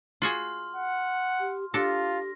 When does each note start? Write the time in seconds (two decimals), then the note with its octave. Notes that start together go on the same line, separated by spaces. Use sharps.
0.22 F4 F#4 G#4 C6 F6
0.76 F#5
1.40 G4
1.74 D4 F4 G4 A4 A#6